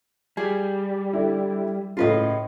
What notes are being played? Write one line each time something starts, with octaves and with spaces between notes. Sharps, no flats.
G3 G#4
D3 E4
A2 C#3 F4 B4 D#5